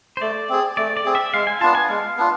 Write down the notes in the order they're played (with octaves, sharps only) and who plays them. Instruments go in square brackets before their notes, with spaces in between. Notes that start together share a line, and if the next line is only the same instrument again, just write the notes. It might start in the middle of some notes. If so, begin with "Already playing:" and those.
[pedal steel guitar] C5
[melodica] A3 [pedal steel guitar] D5
[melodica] C4 G#4
[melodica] A3 [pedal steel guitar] D5
[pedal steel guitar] D5
[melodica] C4 G#4
[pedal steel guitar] E5
[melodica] G#3 [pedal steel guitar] F5
[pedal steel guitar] G#5
[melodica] B3 D4 F4 [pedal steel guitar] A5
[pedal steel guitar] G#5
[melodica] G#3 [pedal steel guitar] F5
[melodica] B3 D4 F4